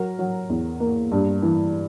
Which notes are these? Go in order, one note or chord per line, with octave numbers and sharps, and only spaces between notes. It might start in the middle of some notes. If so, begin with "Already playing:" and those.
Already playing: F#3 F#4 A#4
F#3
E2
A#3
G2
E3